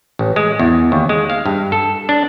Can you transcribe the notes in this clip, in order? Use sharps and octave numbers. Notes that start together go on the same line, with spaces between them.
A1
G#3
E2
D#2
G#3
F5
G2
A4
D4